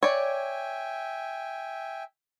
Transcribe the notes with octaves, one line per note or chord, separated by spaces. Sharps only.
C#5 D5 E5 G5 G#5